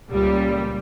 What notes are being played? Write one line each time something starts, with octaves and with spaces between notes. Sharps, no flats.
C#2 A#2 G3